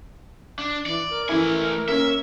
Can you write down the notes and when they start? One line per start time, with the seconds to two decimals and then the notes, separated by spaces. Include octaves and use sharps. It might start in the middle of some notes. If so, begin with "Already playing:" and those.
0.59 D4
0.86 E3 D5
1.10 A#4
1.29 E3 A3 E4 G#5
1.88 A#3 C#4 E5